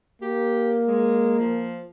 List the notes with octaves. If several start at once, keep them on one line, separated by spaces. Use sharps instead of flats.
A#3 G4
G#3
F3